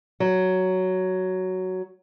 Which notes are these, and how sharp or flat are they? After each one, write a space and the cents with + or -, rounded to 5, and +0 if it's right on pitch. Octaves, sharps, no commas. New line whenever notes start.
F#3 +5